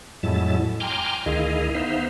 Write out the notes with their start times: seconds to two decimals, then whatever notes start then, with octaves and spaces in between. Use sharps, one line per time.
0.23 F2 A2 F#3 G#3 E4 A5
0.80 G5 G#5 A#5 C6 D6 F6
1.26 D2 D#3 E4 G#4 D#5 F5
1.74 B3 D#4 C5 E5 F5